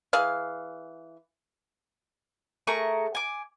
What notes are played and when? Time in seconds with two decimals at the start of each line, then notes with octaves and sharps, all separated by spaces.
0.13 E3 G#4 F5
2.67 A3 G#4 A#4 C#6
3.15 G#5 D6